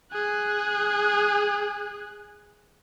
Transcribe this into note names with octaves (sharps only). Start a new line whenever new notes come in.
G#4 F#6